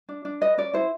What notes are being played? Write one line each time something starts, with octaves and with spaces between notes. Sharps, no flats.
D4
D4
B4 D#5
C#4 D5
E4 C5